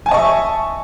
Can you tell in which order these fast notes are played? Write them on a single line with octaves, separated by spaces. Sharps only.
G#5 A5 D#5 C#6 E5